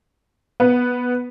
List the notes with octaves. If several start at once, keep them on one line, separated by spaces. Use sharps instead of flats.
B3